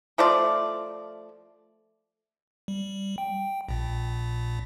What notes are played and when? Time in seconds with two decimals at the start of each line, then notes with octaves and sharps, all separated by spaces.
0.18 F3 A3 F4 D5
2.68 G3
3.18 G5
3.69 A#1 A#2